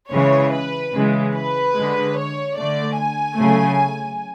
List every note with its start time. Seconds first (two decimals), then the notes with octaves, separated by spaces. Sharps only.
0.11 C#3 E3 G#3 C#5
0.52 B4
0.93 C#3 E3 G#3
1.33 B4
1.74 D3 G#3
2.16 C#5
2.56 D3 A3 D5
2.97 G#5
3.37 C#3 F#3 A3